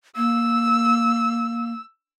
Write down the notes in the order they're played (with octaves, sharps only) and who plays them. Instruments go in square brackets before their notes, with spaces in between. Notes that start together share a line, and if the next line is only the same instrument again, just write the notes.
[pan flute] A#3 [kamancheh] E6